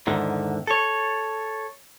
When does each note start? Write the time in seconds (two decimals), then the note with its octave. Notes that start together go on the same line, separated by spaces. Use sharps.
0.07 E2 G#2 D3 D#3
0.67 A4 C#5